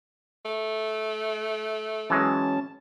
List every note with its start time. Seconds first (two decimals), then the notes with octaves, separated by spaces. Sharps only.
0.45 A3
2.10 E3 F#3 G#3 C#4 A5